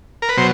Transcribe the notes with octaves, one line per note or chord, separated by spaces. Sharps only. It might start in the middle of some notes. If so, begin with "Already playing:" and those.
A#4
B4
B2 F#3 C5